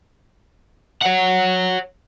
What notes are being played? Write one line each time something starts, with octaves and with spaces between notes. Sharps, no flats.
C#5 F#5